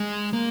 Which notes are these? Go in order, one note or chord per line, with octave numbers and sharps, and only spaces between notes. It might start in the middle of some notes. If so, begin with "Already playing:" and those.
Already playing: G#3
A#3